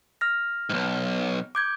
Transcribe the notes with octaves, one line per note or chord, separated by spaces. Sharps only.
F6 A#6
B1 G#2
D6 G6 G#6